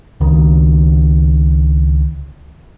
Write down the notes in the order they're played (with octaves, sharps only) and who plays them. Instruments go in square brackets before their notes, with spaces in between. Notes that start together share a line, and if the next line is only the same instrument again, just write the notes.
[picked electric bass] C#2 D#3